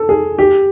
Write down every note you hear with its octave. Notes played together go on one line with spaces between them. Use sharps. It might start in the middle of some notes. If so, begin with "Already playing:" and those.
Already playing: A4
G#4
G4